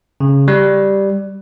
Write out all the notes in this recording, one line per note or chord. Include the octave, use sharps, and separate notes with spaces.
C#3
G3